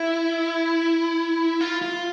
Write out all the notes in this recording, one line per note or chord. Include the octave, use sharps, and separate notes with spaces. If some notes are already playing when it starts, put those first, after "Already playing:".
Already playing: E4
F4
F4